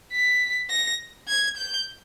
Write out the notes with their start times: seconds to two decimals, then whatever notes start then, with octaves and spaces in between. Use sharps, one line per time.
0.13 B6
0.70 A#6
1.28 G#6
1.57 G6